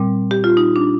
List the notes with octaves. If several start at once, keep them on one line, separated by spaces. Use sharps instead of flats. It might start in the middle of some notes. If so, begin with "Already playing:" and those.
Already playing: A#2 G3 C4
G4
F4
D#4
D4